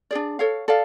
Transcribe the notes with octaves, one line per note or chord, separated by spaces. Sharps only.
D4 G#4 D5
A4 C#5 F5
A4 D5 F5